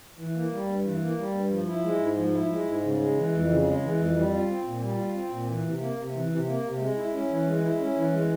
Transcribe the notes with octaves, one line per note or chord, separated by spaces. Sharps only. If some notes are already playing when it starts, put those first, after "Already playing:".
E3
A#3
G3
G2
E3
A#3
G3
G2
F3
E4
G#3
G#2
F3
E4
G#3
G#2
C#3
G#3
E3
F2
C#3
G#3
E3
F2
G3
F4
C4
A#2
G3
F4
C4
A#2
E3
C3
A#3
C3
E3
C3
A#3
C3
G#3
E4
C#4
E3
G#3
E4
C#4
E3
G#3